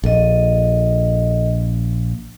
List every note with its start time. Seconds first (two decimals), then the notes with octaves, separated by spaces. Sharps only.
0.04 A#1 A4 D#5